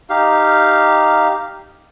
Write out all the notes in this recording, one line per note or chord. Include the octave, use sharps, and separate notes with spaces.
D#4 G4 F5